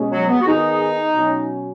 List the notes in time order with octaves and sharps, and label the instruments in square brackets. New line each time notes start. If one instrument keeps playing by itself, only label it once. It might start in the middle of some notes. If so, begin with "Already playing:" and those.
Already playing: [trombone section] B2 G#3 C#4
[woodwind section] F#3
B3
F#4
[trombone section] D#3 B3 G#4 [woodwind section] D#4
[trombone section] B2 F#3 C#4